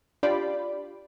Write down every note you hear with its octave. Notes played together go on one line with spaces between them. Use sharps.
D4 F4 G4 D5 B5